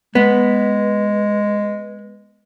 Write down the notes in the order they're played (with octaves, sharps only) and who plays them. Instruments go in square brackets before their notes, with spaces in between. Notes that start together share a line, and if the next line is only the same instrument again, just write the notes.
[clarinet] G#3 [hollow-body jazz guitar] B3